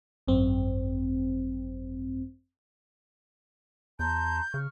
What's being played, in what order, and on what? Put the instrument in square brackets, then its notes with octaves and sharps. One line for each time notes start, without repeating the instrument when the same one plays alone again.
[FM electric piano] G#1 F#2 C4
[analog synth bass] E2 [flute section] A5 A#5 C6 [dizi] G6
[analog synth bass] C#3 [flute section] C#6 F6